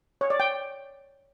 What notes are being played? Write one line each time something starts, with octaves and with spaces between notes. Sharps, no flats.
C#5
D5
G5